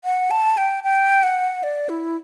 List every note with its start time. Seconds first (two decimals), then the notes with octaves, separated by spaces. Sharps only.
0.04 F#5
0.31 A5
0.57 G5
0.84 G5
1.23 F#5
1.63 D5
1.89 E4